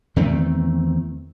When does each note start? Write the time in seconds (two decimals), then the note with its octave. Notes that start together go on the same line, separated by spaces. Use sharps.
0.16 E2 D#3 A3 C4